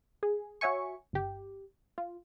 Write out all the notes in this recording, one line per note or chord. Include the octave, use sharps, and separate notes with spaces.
G#4
F#4 C#5 E5 G#5 C#6
G1 G4
F4